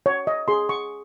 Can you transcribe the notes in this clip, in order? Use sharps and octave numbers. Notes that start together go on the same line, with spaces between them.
C#5
D#5
G#4 C6
C#6